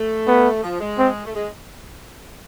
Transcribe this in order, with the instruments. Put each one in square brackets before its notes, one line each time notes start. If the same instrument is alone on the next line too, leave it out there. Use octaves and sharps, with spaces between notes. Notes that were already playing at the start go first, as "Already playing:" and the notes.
Already playing: [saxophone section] A3
[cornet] B3
[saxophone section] F3
G#3
[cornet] C4
[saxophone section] A3
G#3